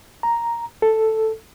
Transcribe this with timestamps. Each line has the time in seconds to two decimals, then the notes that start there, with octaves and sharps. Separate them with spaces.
0.23 A#5
0.82 A4